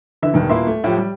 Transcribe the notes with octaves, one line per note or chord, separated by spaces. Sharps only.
D3 E3 E5
E1 G2 D#3 B4
D#1 A#3 E4 B4 E5 C6
A3
A2 F3 G4
G3